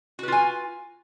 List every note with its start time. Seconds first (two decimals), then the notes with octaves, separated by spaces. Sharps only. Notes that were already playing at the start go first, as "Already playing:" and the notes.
0.19 F#4
0.23 B4
0.28 F4
0.32 G#5